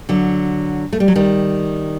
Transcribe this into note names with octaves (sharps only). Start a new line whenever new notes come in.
D3 F#3
A3
G3
F#3
D#3 G3